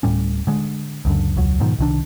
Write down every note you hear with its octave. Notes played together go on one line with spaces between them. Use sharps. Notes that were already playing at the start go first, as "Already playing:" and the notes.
D1 A2 G3 C#4
D3 G#3
C#2 F#2 D3
E1 C#2 F#3
G#2 B2 D#3 F3
C2 D#3 D4